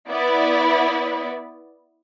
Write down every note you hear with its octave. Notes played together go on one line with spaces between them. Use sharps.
B3 E4 B4 D5